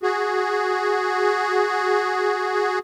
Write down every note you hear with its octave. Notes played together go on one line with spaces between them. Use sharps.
F#4 G#4